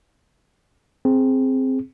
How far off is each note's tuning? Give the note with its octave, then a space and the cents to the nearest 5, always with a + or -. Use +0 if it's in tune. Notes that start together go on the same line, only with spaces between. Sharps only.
C4 +0 G#4 +0